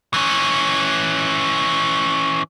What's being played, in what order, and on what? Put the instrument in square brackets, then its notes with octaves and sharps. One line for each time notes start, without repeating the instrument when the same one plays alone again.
[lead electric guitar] E3 C#4